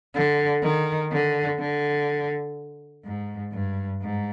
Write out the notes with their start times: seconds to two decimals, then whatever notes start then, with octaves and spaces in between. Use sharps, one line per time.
0.15 D3
0.63 D#3
1.12 D3
1.59 D3
3.05 G#2
3.52 G2
4.01 G#2